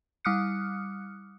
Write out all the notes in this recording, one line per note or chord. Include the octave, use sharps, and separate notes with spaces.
G3 D6 D#6 F6 F#6 C#7